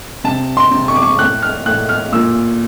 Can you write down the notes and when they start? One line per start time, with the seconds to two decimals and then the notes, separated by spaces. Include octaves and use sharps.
0.24 C3 A5
0.57 C6
0.71 C3
0.88 C#6
0.96 D6
1.02 C#6
1.19 A2 F#6
1.42 F6
1.66 A2 F#6
1.89 F6
2.13 A#2 E6